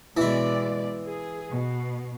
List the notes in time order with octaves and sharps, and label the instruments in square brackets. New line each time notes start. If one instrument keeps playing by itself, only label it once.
[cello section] B2 G#3 D5 [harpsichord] E3 E4
[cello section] G#4
B2